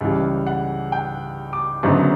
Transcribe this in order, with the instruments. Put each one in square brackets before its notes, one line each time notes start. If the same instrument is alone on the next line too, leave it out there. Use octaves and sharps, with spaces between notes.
[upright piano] C#2 C#3 E3 G3
F#5
G5
D6
F#1 F#2 D3 F#3 B3